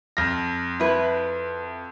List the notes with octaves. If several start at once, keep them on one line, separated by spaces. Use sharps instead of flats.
F2 F6 A#6
E4 B4